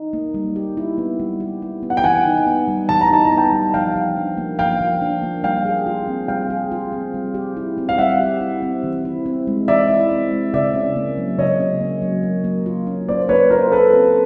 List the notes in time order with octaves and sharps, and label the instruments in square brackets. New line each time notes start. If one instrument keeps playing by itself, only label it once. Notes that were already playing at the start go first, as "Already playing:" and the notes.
Already playing: [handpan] D#4
A#3
G3
G4
E4
B3
G3
G4
E4
B3
[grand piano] F#5
G5
[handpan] E3 [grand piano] F#5 G#5
[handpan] D#4
B3
G3
[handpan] E3 [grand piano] A5
[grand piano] A#5
[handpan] D#4 [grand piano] A5
[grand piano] A#5
[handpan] B3
[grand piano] G5 A5
[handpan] G3
[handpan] F3 [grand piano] F5 G5
[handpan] F3
D4
A#3
[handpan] F3 [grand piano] F5 G5
[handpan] F3
D4
A#3
[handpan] G3 [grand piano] F5 G5
[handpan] G#4
F4
C4
[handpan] G3 [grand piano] F5 G5
[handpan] G#4
F4
C4
G3
G4
E4
C4
[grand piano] F5
[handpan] G3 [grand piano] E5 F#5
[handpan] G4
E4
C4
E3
E4
C4
G#3
[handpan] E3 [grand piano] D5 E5
[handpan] E4
C4
G#3
[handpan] C#3 [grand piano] D5 E5
[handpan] C#4
A#3
F#3
[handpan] C#3 [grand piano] C#5 D#5
[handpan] C#4
A#3
F#3
A#3
A#3
F4
C#4
[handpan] A#3 [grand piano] C5 D5
[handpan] A#3 [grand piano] B4 C#5
[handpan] F4 [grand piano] A#4 C5
[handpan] C#4 [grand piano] A4 B4
[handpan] C4